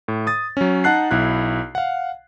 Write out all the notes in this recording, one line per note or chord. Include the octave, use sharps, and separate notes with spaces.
A2
D#6 A6
F#3 C#4
D#4 F#5 A5 F#6 C7
B1 E4 F#6
F5 F#5